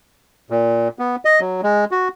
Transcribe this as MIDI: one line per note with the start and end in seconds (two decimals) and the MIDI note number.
0.50 0.88 46
0.99 1.16 59
1.25 1.40 75
1.41 1.61 54
1.63 1.85 56
1.91 2.08 66